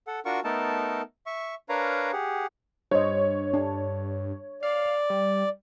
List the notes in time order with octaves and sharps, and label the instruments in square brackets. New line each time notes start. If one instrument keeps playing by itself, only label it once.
[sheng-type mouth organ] A4 F#5
D4 F4 F#4 A#4 F#5 C#6
A3 B3 D#4 A4 A#4 A5
E5 C#6
D4 A#4 B4 C#5 F5 A#5
G4 G#4 F#5
[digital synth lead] G2 [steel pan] C5 D#5 [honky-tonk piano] C#5
[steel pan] D4
[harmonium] D5 [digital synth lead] F5
[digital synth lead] G3